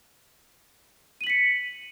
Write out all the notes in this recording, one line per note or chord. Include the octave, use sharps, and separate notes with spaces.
B6 C#7 D#7 F#7